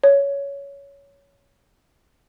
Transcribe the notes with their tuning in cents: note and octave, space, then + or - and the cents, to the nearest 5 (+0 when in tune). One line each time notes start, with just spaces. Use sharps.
C#5 +15